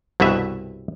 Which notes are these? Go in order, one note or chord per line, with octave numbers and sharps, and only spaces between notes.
C2 G2 B2 B4 E5